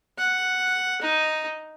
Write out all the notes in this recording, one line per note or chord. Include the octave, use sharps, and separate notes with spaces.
F#5
D#4